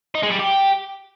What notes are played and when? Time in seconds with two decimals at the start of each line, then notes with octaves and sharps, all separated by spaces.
0.15 D#4
0.23 G#3
0.31 G3
0.40 G4